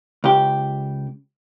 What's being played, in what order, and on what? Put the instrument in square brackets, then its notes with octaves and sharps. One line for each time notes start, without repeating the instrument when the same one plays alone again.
[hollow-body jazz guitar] C#2 G4